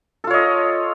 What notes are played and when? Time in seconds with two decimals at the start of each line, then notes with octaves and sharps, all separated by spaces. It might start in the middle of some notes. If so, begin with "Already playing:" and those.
0.24 A4
0.27 F4
0.30 C#5
0.34 D#5